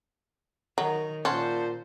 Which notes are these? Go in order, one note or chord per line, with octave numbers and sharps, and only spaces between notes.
D#3 F#3 A#4
A#2 C#4 C5 F#5 A5 C6